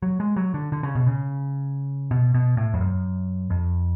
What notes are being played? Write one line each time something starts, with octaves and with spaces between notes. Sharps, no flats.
F#3
G#3
F#3
D3
D3
C#3
B2
C#3
B2
B2
A2
F2
F#2
F2